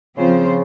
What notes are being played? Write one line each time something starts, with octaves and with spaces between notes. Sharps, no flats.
C#3 F3 C4 F4 C5